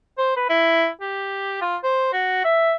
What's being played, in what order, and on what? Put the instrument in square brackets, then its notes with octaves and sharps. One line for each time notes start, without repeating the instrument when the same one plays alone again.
[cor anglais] C5
B4
E4
G4
F4
C5
F#4
E5